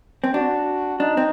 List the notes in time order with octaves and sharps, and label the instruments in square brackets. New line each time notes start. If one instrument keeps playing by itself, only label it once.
[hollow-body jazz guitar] C4
[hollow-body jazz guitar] D4 [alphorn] F#4
[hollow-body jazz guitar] D4 [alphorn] D#4
[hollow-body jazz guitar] C4